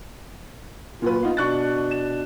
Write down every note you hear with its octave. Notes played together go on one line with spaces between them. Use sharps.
A#2 F#3 F4 B4
B3 D#4 F4 F5
B2 D4 C#6 F#6 A6
E7